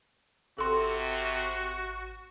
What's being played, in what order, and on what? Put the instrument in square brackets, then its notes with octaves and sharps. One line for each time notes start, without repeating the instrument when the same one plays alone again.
[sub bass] G#1 [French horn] C3 [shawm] F#4 [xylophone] A4 C6